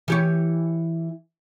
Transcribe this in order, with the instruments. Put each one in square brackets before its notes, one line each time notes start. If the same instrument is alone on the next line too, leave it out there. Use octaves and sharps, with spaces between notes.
[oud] E3 G4 C#5